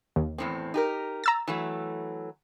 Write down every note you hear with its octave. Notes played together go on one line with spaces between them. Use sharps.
D#2
E2 A2 C4
D#4 G4 A#4
A#5 E6 A6
E3 F#3 A3